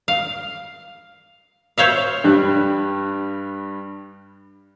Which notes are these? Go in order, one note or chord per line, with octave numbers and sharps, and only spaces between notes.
F5
C5 C#5 E5 F5
G2 G3 F#6